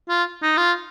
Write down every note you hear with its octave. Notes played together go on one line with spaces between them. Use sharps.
F4
D#4
F4